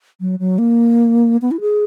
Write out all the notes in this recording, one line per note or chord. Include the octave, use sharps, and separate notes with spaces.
F#3
F#3
A#3
B3
E4
G#4